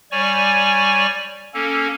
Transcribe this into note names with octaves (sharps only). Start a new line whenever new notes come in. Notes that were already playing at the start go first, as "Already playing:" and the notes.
G3 C#5 D5 G#5 C#6
A#3 C#4 A4